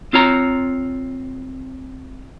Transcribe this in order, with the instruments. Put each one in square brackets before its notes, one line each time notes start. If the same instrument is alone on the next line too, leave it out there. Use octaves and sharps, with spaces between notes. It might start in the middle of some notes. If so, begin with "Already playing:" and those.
[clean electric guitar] C4 F4 C#5 A#5